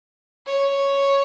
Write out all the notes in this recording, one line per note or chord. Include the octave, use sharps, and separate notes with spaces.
C#5